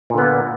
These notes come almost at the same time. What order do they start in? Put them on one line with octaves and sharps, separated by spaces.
A#2 D3 B3 A#3